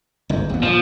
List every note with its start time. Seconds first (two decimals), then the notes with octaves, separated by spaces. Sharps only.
0.29 G1 G#2
0.50 D#2 B3
0.63 A#2 F3